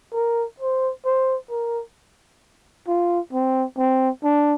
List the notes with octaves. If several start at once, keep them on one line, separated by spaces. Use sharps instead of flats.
A#4
C5
C5
A#4
F4
C4
C4
D4